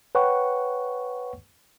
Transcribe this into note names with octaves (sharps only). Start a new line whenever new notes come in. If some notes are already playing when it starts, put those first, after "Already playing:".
B4 C#5 F#5 G5 C#6